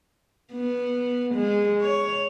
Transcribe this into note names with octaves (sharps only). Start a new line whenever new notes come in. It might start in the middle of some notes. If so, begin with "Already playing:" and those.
B3
G#3
C#5